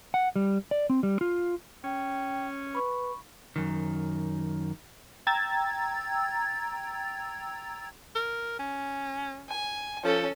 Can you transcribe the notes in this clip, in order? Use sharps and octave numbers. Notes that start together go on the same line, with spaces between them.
F#5
G3
D5
C4
G3
F4
C#4 G5
B4 B5 C#6
F#2 D#3
G5 A#5 E6 G#6 A6
A#4
C#4
G#5
F3 C#4 A4